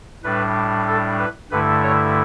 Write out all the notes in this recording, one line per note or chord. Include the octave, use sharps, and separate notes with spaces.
A2 G3 D4 B4
A4
B4
G2 D3 A3 E4 B4
C#5